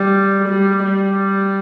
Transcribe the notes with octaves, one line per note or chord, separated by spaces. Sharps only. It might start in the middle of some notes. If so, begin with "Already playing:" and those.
Already playing: G3
G3
G3